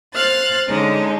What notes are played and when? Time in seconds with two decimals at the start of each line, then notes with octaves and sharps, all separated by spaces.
0.14 C5 F5 F#6 A6
0.69 D3 G#3 C#4 D#4